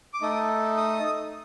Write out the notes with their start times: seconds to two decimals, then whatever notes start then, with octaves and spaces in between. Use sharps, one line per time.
0.14 D6
0.22 A3 D#4 A4 D#6
0.77 D#6